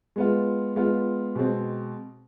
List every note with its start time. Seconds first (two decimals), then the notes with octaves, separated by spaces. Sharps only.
0.16 G#3 B3 F4
0.76 G#3 B3 F4
1.35 B2 G#3 C4